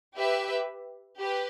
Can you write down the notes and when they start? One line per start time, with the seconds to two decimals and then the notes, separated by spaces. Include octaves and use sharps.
0.13 G4 B4 E5
1.19 G4 B4